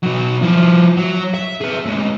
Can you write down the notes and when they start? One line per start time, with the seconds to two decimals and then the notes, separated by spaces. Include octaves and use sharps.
0.03 B2 F#3
0.42 F3 E4
0.97 F#3
1.34 E5
1.61 G#4 B4
1.86 D2 G#3